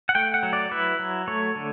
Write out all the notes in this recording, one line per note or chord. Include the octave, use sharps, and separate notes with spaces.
F#5
A3 G5
F#5
F#3
D5
E4 B4
F#3
A3 C#5
D3